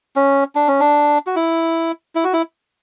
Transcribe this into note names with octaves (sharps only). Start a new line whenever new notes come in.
C#4
D4
C#4
D4
F#4
E4
E4
F#4
E4